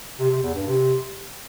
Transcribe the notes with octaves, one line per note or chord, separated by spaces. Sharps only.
C3
C3
E2
G2
C3